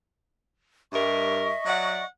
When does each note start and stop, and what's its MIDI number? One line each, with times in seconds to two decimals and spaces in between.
0.92 1.50 43
0.92 1.50 55
0.92 1.50 70
0.92 2.03 75
0.92 2.03 76
0.92 2.03 85
1.66 2.01 54
1.66 2.01 74
1.66 2.01 78